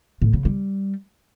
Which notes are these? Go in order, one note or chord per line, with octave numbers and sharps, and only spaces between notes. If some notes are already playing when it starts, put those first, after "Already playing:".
A2
C#3
G3